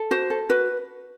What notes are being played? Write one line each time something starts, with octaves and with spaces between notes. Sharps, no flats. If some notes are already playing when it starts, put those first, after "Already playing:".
Already playing: A4
F#4 C5
A4
F#4 B4